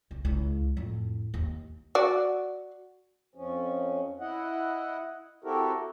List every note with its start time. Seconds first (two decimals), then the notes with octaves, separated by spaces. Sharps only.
0.11 C2
0.25 C#2 E4
0.77 F2 A2
1.34 D#2
1.95 F#4 D5
3.35 F2 F3 C#4
4.20 E4 D#5 F#5
5.44 C4 E4 F#4 G4 A4 A#4